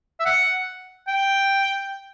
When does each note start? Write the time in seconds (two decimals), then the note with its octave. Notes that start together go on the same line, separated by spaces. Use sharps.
0.20 E5
0.26 F#5
1.08 G5